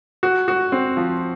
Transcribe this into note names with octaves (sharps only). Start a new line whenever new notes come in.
F#4
F#4
C4
F3